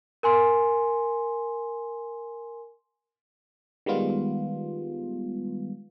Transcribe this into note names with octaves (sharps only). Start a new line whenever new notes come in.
A#4 G#5 C6
D#3 G3 G#3 B3 F4